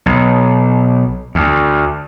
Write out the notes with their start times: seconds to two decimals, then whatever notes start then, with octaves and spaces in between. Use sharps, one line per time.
0.06 B1
1.35 D2